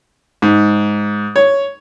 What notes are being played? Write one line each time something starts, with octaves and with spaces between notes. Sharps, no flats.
G#2
C#5